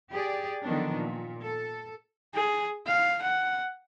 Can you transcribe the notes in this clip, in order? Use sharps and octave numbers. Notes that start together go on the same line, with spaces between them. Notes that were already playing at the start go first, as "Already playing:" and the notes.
G4 G#4 D5
D3 D#3 F3 F#3 B3 D4
A#2
A4
G#4
F5
F#5